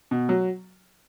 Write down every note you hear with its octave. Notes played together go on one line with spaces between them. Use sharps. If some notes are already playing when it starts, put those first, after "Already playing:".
B2
F#3